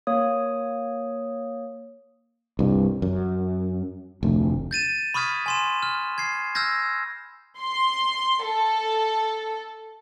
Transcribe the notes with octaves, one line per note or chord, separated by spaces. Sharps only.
A#3 C#5 D#6
C2 G2
F#2
F1 D2
G6 A6 D#7 E7
B5 C#6 D#6 F6 G#6 B6
G#5 C6 E7
F6
G#6 C7
E6 F6 G6 G#6 A#6
C6
A4